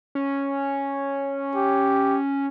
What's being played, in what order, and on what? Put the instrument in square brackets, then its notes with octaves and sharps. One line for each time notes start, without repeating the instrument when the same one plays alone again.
[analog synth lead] C#4
[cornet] G4